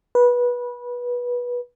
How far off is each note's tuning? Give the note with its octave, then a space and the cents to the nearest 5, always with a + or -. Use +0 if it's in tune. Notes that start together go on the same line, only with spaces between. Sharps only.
B4 -20